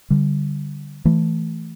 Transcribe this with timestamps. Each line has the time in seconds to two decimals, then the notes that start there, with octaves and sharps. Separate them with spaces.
0.10 D3 G3
1.05 E3 A3